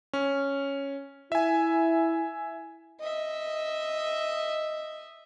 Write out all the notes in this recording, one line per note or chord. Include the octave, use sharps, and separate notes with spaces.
C#4
E4 E5 G#5
D#5 E5